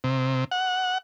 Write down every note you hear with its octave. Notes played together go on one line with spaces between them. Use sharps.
C3
F#5